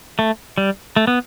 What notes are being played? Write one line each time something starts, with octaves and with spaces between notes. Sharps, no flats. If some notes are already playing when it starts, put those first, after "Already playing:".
A3
G3
A3
B3